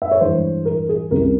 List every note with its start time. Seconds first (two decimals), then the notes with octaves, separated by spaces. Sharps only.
0.02 E5
0.11 C#5
0.21 G2 E3 G#3 C5
0.65 A#4
0.89 G#4
1.11 C2 C3 G3 C#4 A#4